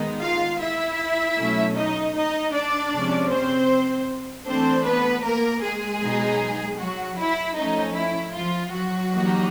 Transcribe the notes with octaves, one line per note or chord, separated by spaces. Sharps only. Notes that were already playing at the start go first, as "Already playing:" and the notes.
Already playing: D#3 G#3 B3 D#4
F4 F5
E4 E5
B2 F#3 A3 C#4
D#4 D#5
D#4 D#5
D4 D5
C3 F3 G#3 C#4
C4 C5
E3 A3 C4 D4 C5
B3 B4
A#3 A#4
G#3 G#4
B2 F#3 B3 D#4
F#3 F#4
E4
F3 A3 C#4 D#4
E4
F3 F4
F#3 F#4
E3 G3 A#3 D#4